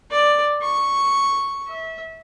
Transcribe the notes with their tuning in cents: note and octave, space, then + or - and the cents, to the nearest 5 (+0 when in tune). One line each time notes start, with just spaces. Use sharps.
D5 +5
C#6 +0
E5 -25